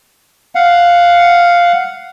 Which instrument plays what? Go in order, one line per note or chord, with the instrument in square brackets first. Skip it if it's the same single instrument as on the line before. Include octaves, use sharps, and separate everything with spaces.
[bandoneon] F5 F#5